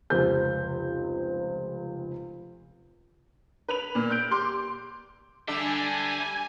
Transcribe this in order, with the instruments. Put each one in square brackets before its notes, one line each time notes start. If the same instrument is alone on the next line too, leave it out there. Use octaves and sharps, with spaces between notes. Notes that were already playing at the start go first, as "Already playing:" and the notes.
[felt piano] F1 C#2 C5 G6
[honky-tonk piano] B4 B5 F7
A#2
F#6 G6 D7
G4 C6 D6
[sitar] D3 D4 E5 [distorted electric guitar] G3 G4 [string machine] G#5